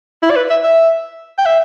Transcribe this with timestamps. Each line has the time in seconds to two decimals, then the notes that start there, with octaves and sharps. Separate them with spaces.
0.23 E4
0.30 D5
0.36 B4
0.50 E5
0.63 E5
1.38 G5
1.46 E5